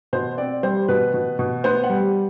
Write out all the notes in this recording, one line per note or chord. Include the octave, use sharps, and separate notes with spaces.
B2 C5
C4 D5
G3 C5
B2 B4
B2
B2
B3 C5
F#5
G3